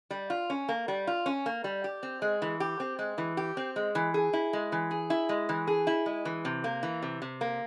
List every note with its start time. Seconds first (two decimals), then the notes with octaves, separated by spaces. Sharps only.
0.11 G3
0.30 F4
0.50 C#4
0.69 A#3
0.88 G3
1.07 F4
1.26 C#4
1.46 A#3
1.64 G3
1.84 G4
2.03 C4
2.22 G#3
2.42 E3
2.60 G4
2.80 C4
2.99 G#3
3.18 E3
3.37 G4
3.57 C4
3.76 G#3
3.95 E3
4.14 G#4
4.33 E4
4.53 G#3
4.72 E3
4.91 G#4
5.10 E4
5.29 G#3
5.49 E3
5.67 G#4
5.87 E4
6.06 G#3
6.25 E3
6.45 C3
6.64 A#3
6.83 E3
7.02 C3
7.22 C3
7.41 A#3